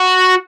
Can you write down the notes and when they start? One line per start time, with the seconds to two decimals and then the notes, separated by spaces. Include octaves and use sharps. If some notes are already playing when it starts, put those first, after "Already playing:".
Already playing: F#4